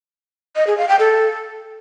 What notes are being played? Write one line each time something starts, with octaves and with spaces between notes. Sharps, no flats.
D#5
G#4
F5
G5
A4